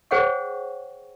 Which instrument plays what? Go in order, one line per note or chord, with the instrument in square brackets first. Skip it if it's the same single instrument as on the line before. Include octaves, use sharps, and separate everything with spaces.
[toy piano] G#4 C5 C#5 F#5 G5 C#6